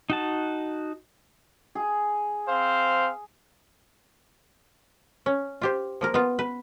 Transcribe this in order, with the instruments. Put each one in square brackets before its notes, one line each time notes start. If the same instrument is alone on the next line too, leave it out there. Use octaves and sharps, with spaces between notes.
[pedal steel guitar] D#4 F#4 A5
[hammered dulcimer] G#4
[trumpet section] C4 C5 F5
[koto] C#4
F4 G4 C5
F3 A#3 A#4
B3 F4
B4